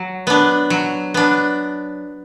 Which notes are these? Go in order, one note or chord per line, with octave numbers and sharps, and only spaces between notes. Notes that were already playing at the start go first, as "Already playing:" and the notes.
Already playing: F#3
B3 D4
F#3
B3 D4